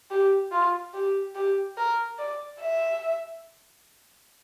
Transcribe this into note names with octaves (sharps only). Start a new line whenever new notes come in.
G4
F4
G4
G4
A#4
D5
E5